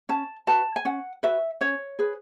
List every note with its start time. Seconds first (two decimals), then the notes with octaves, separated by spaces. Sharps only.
0.09 C#4 A5
0.47 F#4 B4 A5
0.76 G#5
0.85 C#4 F#5
1.23 F#4 B4 E5
1.61 C#4 C#5
1.99 G#4 B4